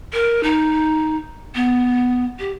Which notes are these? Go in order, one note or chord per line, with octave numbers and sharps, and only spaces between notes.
A#4
D#4
B3
G4